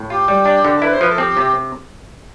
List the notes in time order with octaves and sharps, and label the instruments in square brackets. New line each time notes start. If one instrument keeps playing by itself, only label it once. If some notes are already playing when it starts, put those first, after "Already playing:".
Already playing: [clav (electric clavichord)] A2
[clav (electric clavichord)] F4 [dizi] G4
[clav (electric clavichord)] G3
D4
D3
[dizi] A4
[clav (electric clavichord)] E4 [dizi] B4
[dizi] C5
[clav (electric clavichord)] F3 [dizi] B4
[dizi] A4
[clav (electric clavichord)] C4 [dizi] G4
[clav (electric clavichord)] C3